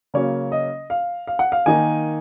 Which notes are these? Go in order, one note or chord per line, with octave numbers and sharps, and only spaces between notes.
C#3 F#3 A#3 C#4 C#5
D#5
F5
F5
F#5
F5
D#3 A#3 D#4 G#5